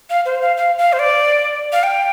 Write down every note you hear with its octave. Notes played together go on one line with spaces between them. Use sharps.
F5
C5
F5
F5
F5
C5
D5
F5
G5